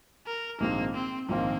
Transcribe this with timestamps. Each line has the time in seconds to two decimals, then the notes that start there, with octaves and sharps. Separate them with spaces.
0.26 A#4
0.60 A#1 G#2 D#3 G#3 A#3 C4
0.94 C4
1.28 A#1 G#2 D#3 A#3 C4 F4